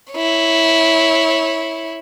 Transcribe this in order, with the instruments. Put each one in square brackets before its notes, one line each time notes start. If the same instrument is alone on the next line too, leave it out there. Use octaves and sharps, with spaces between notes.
[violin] E4 C#5